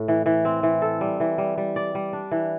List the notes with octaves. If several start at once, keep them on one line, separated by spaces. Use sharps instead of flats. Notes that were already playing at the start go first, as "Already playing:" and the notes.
Already playing: A2
E3
E3
C4
E3
A4
G3
E3
G3
G3
D5
G3
D4
E3